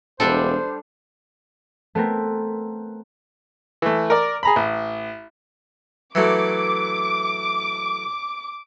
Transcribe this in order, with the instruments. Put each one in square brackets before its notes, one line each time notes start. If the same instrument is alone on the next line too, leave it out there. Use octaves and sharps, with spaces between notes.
[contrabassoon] E1 [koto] G3 D4 A4 [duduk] C5
[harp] A3 B3 C4 A#4
[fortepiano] E3 A3
A#4 D5
G#4 A#5 B5
A1
[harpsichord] E3 F#3 A3 [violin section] D6